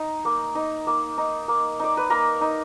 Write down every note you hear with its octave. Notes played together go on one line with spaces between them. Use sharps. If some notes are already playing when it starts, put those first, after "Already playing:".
Already playing: D#4
A#3
D#4
A#3
D#4
A#3
D#4 D5
B4
A#3 A#4
D#4